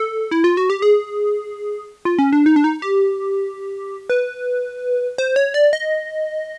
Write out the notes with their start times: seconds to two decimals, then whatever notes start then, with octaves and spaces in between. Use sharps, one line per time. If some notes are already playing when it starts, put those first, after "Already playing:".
Already playing: A4
0.31 E4
0.44 F4
0.57 F#4
0.70 G4
0.82 G#4
2.05 F4
2.19 C#4
2.33 D4
2.46 D#4
2.56 D4
2.64 D#4
2.82 G4
4.10 B4
5.18 C5
5.36 C#5
5.54 D5
5.73 D#5